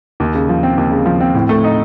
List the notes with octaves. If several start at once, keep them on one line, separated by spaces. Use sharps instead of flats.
D#2
C#3
F3
C4
D#2
C#3
F3
C4
A2
A3
D#4